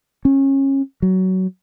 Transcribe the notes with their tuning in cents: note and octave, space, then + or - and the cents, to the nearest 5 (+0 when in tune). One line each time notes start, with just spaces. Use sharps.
C#4 -25
F#3 +15